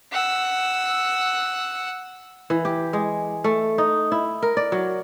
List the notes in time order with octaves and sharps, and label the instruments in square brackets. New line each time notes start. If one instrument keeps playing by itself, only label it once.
[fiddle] F#5 E6
[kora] E3
G4
G#3
A3
D#4
E4
A#4
D5
F#3